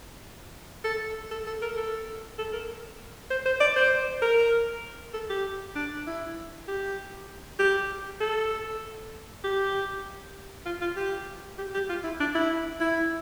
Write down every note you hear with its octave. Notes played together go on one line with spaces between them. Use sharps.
A4
A4
A4
A#4
A4
A4
A#4
C5
C5
D5
C5
A#4
A4
G4
D4
E4
G4
G4
A4
G4
F4
F4
G4
G4
G4
F4
E4
D4
E4
E4